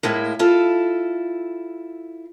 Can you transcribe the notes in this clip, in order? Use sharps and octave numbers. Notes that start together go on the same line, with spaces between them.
A2 G#3 A#3 E4
E4 F4 A4